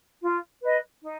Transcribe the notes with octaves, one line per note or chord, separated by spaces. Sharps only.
F4
B4 D#5
D#4